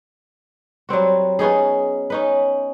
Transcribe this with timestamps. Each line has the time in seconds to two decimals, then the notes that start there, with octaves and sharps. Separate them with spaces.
0.89 F#3 G3 C4 F#4
1.39 B3 C#4 D#4 G#4
2.10 C#4 D#4 B4